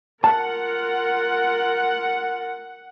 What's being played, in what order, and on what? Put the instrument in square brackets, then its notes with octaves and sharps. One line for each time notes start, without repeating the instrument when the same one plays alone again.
[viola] F4 A#4 [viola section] F#5 [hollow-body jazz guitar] A5